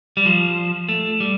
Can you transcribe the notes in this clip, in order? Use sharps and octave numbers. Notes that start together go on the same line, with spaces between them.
G3
F3
A3
G3